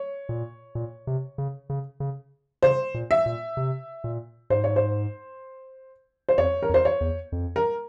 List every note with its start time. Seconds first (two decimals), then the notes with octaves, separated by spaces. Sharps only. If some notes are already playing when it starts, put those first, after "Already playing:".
Already playing: C#5
0.29 A#2
0.75 A#2
1.07 C3
1.38 C#3
1.70 C#3
2.00 C#3
2.63 C#3 C5
2.94 A#2
3.11 E5
3.26 A#2
3.57 C3
4.04 A#2
4.50 G#2 C5
4.64 C#5
4.76 C5
6.29 C5
6.38 F2 C#5
6.63 A#4
6.69 F2
6.74 C5
6.85 C#5
7.01 E2
7.32 F2
7.56 A#4